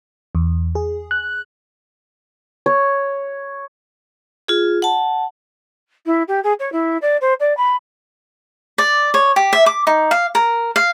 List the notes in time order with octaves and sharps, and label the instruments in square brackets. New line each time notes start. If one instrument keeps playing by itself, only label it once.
[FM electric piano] E2
G#4
F#6
[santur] C#5
[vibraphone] F4 G#4
F#5 A5
[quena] E4
G4
G#4
C#5
E4
D5
C5
D5
B5
[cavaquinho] D5
C#5
G4
E5
D6
D#4
F5
A#4
F5